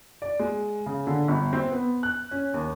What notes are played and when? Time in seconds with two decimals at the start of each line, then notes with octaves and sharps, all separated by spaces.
0.22 D5
0.39 G#3
0.86 C#3
1.07 D3
1.28 G1
1.53 C4
1.72 B3
2.03 F#6
2.31 C#4
2.54 D#2